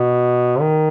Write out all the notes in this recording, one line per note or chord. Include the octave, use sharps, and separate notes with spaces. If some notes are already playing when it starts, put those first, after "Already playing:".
Already playing: B2
D#3